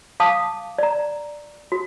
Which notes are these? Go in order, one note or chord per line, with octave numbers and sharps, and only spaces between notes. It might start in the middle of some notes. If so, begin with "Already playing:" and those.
F5 A5 D6 D#6
D5 A#5
F#4